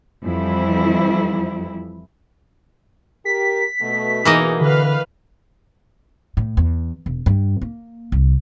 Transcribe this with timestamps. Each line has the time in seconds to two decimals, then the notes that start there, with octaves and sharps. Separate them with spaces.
0.23 F2 E3 F3 G3 E4
3.25 G4 A#4 B6
3.81 B2 A3
4.25 B2 E3 A#3 D#4 G#4 D#5
4.61 D3 B4 F5
6.37 A2
6.57 E2
7.06 E1
7.26 G2
7.62 A#3
8.12 C2